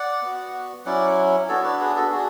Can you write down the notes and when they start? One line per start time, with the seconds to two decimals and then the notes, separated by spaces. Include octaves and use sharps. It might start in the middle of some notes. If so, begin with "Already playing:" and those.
Already playing: D5 F#5
0.22 B3 F#4
0.85 F#3 C#4 E4 D5 F#5
1.49 B3 D4 F#4 A4 C#5
1.64 B4 D5
1.80 G#4 B4
1.96 F#4 A4
2.11 D4 F#4 G#4